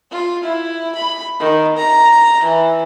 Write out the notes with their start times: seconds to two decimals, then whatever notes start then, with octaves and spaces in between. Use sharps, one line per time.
0.11 F4
0.43 E4
0.95 B5
1.40 D#3
1.77 A#5
2.43 E3